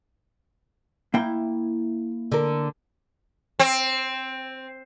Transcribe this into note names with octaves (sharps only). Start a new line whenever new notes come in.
A#3 E4 G5
D3 A#4
C4